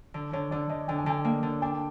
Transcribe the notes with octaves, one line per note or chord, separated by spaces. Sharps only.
D3
D3 C#5
D3 D5
D3 D#5
D3 G5
G#5
D3 G5
A#3
D3
D4 G5